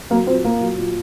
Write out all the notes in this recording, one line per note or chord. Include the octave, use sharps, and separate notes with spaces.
F#3 A#3
A#2 C4
A#2 A#3
F#3
A#2